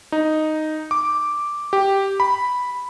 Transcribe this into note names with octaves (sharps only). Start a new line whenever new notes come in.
D#4
D6
G4
B5